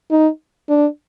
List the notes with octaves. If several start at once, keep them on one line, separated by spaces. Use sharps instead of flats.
D#4
D4